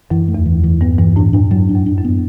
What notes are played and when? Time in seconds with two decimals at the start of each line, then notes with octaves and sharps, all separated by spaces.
0.10 F#2 E3
0.28 A3
0.34 E2
0.46 E3
0.64 E3
0.81 G2 B3
0.98 G2 E3
1.16 A2 D4
1.33 G2 D4
1.51 F#2 F#3
1.69 D4
1.75 F#2
1.86 D4
1.98 F#2
2.04 B3